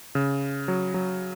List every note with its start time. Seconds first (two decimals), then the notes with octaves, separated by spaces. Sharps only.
0.15 C#3
0.68 F#3
0.94 F#3